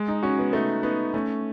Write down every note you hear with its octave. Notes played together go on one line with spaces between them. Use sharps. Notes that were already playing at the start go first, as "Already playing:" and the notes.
Already playing: G#3
D#4
C#4 F#4
B3
A3 D#4
B3 D#4
A3 C#4